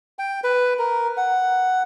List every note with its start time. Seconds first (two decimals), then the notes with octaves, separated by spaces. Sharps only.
0.19 G5
0.44 B4
0.79 A#4
1.17 F#5